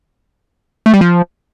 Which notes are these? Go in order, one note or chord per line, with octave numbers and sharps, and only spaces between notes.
A3
G3
F3